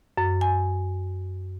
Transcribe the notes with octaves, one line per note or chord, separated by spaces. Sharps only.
F#2
G#5